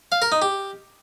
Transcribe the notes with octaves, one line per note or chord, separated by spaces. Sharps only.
F5
A#4
D#4
G4